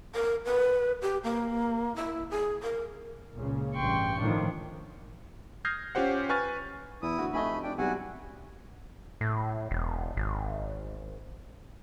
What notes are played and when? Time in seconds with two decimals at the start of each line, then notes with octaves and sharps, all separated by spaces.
0.15 A#4
0.46 B4
1.02 G4
1.24 A#3
1.96 E4
2.31 G#4
2.63 A#4
3.34 C#2 A#2 C#3
3.74 A1 G2 G5 C6 C#6
4.20 A2 D#3 F3 D4
5.65 D#6 F6 G6 G#6 A#6 C7
5.95 C#4 F4 G4 C5 F#5
6.29 B4 G#5 C#6 F6 A6
7.02 E2 E4 D#6
7.19 D2 F#4
7.33 F1 A3 D#5 G#5 B5 C#6
7.63 D4 G5
7.78 B1 C3 G3 F#4 F#5 G#5
9.21 A2
9.71 E1
10.17 G#1